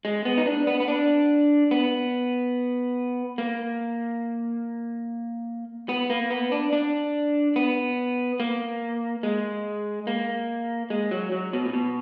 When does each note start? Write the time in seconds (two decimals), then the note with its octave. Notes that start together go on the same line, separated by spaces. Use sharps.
0.05 G#3
0.25 B3
0.37 D#4
0.46 D4
0.67 B3
0.80 B3
0.88 D4
1.71 B3
3.38 A#3
5.89 B3
6.10 A#3
6.30 B3
6.52 D4
6.73 D4
7.56 B3
8.40 A#3
9.23 G#3
10.07 A#3
10.90 G#3
11.11 F#3
11.32 F#3
11.53 B2
11.66 A#2
11.73 B2